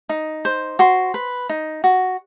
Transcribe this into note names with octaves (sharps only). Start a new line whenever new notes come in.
D#4
C5
F#4 C6
B4
D#4
F#4